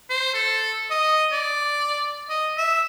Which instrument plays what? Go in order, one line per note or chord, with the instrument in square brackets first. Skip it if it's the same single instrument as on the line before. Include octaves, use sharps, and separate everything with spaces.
[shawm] C5
A4
D#5
D5
D#5
E5